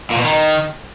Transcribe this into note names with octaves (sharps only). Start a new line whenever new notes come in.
A#2
B2
D#3